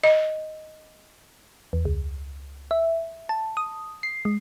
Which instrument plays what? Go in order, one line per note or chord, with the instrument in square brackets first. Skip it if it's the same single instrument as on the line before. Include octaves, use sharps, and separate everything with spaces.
[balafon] D#5
[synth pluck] E2
C#2
E5
A5
D#6
C7
G#3